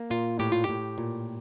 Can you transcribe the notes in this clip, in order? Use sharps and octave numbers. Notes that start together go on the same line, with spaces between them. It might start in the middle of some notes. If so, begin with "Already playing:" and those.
Already playing: A#3
A#2 F4
A2 G4
F4
A2 G4
A#2